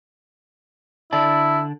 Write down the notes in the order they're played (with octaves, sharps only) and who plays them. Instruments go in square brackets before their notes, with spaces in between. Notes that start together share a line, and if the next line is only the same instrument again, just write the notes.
[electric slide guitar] D3 D5 A5 [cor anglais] E4